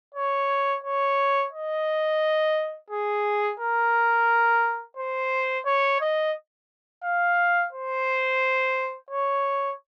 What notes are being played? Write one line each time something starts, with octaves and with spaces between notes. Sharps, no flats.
C#5
C#5
D#5
G#4
A#4
C5
C#5
D#5
F5
C5
C#5